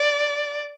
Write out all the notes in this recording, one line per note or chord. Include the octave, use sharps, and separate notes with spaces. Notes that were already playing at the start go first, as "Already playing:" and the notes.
Already playing: D5